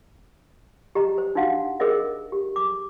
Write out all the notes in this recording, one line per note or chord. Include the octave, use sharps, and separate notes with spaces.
G4 D#5 A#5
C5
D4 D#4 F#4 F5 F#5
G#4 A#4 C5 D#5 E5
G4
D6